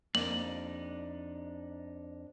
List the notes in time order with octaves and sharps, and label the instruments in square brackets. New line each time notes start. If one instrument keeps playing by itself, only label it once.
[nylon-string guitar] F2 [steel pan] A#3 [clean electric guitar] D4 D#4 G4 [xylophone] F#7